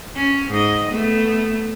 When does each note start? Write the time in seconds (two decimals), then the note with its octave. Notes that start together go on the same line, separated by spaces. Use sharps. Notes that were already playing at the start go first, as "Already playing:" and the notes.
0.16 C#4
0.50 G#2 D#5
0.90 A3 B3